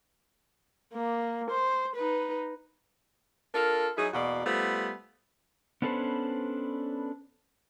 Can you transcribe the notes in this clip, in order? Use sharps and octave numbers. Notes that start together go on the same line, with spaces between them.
A#3
C5
D#4 B4
D4 F4 A4 A#4
F#3 D#4 E4 G#4
E2 B2 A#3 F#4 D5
G3 A3 B3 F4 C5
B3 C#4 D4 A4 B4 C5